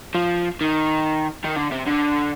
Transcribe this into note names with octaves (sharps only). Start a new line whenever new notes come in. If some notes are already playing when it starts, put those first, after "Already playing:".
F3
D#3
D#3
D3
C3
D3